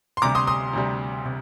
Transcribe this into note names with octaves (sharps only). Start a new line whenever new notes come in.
C6
D2 C3 G3 A#5 D6
C6 D#6
C6 D#6
D2 C3 G3
C3